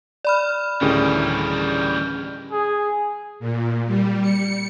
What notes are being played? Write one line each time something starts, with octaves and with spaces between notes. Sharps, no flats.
D5 B5 F6
D2 A2 D#3 E3 G3 C#4 G4 G#4
G#4
A#2
G3
C#7